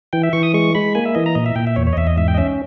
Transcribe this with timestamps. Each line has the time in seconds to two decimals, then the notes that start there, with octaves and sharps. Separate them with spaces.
0.13 E3 G5
0.23 E5
0.33 E3 C#6
0.43 D#6
0.54 G#3 C#6
0.75 G#3 B5
0.95 A#3 G#5
1.06 E5
1.15 E3 D#5
1.26 A#5
1.35 A#2 D#5
1.46 E5
1.56 A#2 G5
1.67 E5
1.76 E2 C#5
1.87 C#5
1.93 D#5
1.97 E2 E5
2.07 D#5
2.17 G#2 E5
2.28 G5
2.34 D#5
2.38 C#4 E5